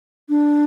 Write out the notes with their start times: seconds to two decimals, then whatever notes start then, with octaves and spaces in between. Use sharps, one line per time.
0.29 D4